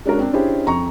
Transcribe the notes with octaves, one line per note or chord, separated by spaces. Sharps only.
G#3 C#4 D4 F#4 A#4
C4 D4
C#4 D4 E4 G4 G#4 C5
F2 A#5 C#6